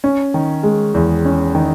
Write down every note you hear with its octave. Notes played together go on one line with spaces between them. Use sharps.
C#4
D#3
G#3
E2
C#4
D#3